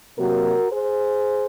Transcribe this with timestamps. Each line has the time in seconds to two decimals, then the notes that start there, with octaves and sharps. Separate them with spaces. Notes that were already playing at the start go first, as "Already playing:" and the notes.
0.18 C3 F#3 A#3 F#4 A#4
0.71 G#4 C5